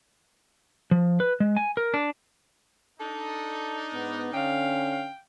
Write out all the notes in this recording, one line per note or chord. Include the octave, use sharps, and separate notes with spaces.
F3
B4
G#3
G#5
A#4
D4
D4 D#4 A4
G#2 B3
D3 C#4 F5 G5